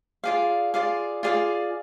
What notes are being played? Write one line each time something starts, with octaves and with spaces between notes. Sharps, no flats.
F4 G#4 D5 F5
F4 G#4 D5 F5
F4 G#4 D5 F5